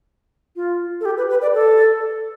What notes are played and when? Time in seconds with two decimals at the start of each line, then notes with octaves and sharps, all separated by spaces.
0.56 F4
1.01 A4
1.05 G4
1.17 B4
1.30 B4
1.42 D5
1.54 A4